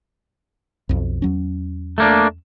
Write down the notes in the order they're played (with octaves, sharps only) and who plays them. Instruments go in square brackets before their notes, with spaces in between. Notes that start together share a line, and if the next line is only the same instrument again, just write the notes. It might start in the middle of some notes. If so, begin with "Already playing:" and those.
[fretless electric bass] B1 F2
E2 F#3 C#4
[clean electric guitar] A3 A#3 D4